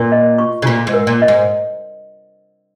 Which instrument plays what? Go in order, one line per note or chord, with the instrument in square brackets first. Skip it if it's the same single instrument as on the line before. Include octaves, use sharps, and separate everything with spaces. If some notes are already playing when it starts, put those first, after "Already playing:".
Already playing: [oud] A#2 [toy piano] A#4
[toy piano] D#5
C#6
[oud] C#3
[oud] A#2 [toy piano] F4
[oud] G#2
[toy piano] A#4
[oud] A#2
[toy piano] D#5
[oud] G#2